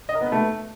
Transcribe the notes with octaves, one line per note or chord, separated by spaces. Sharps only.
D#5
A#4
B3
B4
A3